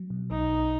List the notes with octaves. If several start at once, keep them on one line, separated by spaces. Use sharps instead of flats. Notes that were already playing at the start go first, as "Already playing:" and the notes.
Already playing: F#3
B2
B1 D#4
B1